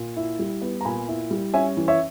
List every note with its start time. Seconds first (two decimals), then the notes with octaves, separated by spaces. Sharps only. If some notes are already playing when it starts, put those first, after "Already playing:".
Already playing: A#2
0.17 E4
0.39 G3
0.62 B3
0.81 A#5
0.85 A#2 G#5 B5
1.08 E4
1.31 G3
1.54 C#4 E5 G#5
1.77 E3
1.88 C#5 E5